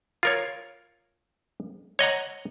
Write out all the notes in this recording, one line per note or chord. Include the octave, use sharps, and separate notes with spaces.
F4 A#4 C#5
C#5 D#5 F#5 A#5